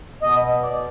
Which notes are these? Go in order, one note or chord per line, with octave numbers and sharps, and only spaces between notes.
B2 D#5
D5